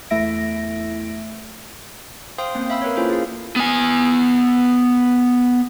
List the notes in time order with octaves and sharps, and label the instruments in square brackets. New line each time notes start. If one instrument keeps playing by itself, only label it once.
[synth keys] E2 A3 E4 E5 A#6 D7
[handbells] C5 F5 G5 C6 D#6
A#3 C4 C#4
E5 F5 B5 E6
A#4 B4 C#5
A#3 C#4 E4 F4 A4 C5
G#4 F5
[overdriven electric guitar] B3 G#5